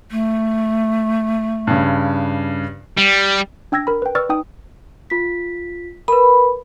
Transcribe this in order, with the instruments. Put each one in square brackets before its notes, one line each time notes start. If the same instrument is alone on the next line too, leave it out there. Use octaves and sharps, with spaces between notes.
[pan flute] A3
[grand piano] G2 C#3
[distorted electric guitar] G3
[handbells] D4 G5 E6 G#6 A#6
A#4 B5
B4 G5
B4 D5 C#6 E6 F6 A6
D#4 G5 D#6
[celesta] F4 B6
[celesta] A#4 B4 [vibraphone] B5